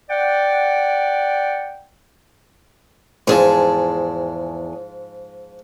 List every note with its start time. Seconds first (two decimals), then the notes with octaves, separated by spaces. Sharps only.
0.10 D5 F#5 G5
3.27 E2 G#2 F3 G#4 A5